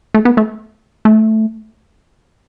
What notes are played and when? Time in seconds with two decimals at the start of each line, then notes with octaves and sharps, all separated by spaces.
0.14 A3
0.25 B3
0.37 A3
1.05 A3